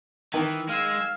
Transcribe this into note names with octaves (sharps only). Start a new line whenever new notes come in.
D#3 E3
G#3 F5 E6 G#6